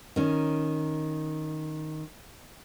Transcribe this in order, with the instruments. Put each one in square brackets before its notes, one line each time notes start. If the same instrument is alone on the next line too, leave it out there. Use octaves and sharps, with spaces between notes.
[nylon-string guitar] D#3 C#4